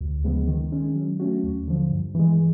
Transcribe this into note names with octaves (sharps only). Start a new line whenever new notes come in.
D2
C#3 F3 G#3 B3
D#3
G#3 C#4
F#3
A3 C#4 F#4
D#2
D3 F3
G2
E3 G#3